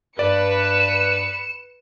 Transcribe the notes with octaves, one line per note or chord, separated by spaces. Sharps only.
G2 B4 D5 C#7 E7